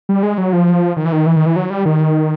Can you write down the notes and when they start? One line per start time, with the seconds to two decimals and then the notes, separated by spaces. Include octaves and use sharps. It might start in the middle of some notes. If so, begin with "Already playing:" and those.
0.09 G3
0.23 G#3
0.38 F#3
0.53 F3
0.97 D#3
1.06 E3
1.12 D#3
1.26 E3
1.36 D#3
1.46 E3
1.56 F#3
1.70 G3
1.86 D#3